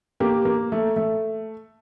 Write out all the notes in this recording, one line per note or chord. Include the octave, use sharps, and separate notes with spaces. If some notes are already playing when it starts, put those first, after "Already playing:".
A#3 G4
A#3
A3
A3